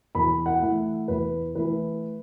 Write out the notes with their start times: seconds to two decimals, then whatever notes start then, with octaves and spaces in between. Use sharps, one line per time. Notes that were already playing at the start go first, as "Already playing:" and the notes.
0.15 E2 B5
0.46 F#5
0.62 E3 A3 E4
1.08 E2 B4
1.55 E3 A3 E4 B4